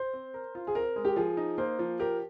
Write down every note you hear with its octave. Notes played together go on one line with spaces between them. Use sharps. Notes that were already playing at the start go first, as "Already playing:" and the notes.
Already playing: C5
C4
A#4
F4
G#4
C4 A#4
G#3
G4
F3 G#4
D#4
A#3 C5
F3
G4 A#4